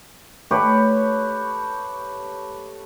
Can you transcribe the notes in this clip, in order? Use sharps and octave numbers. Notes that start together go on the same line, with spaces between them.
A3 G4 B4 C#5